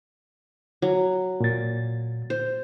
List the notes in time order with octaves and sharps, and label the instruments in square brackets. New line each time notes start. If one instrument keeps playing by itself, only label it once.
[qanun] F#3
[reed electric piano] A#2 A6
[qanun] C5